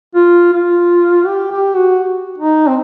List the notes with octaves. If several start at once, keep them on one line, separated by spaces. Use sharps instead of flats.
F4
F4
G4
G4
F#4
D#4
C4